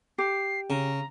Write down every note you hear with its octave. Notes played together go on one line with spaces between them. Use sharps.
G4 C7
C#3 A#5